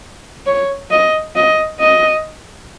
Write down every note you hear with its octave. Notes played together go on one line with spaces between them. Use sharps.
C#5
D#5
D#5
D#5